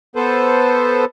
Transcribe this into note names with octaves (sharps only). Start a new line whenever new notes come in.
B3 A4 B4 C5